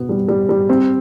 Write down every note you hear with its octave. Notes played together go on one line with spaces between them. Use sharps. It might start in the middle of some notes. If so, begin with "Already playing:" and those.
Already playing: B2 B3
G3
G3
G3
C4